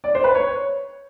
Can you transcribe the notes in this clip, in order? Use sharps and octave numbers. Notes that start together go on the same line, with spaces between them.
D5
C5
B4
C#5